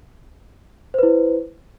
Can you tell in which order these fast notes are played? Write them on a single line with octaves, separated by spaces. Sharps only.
C5 B4 E4